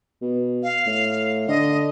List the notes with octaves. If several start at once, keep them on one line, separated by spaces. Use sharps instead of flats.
B2
F5
A2
D3 D#5